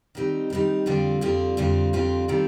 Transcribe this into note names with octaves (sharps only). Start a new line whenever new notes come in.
D#3 G3 C4 D#4
D#3 G3 C4 D#4
F2 D3 G3 C4 F4
F2 D3 G3 C4 F4
F2 D3 G3 C4 F4
F2 D3 G3 C4 F4
D#3 G3 C4 F4 A4